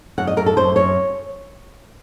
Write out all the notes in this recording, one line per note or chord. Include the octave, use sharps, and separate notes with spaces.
F#2 F#5
D#5
F#2 A#4
A4
F#2 C5
F#2 C#5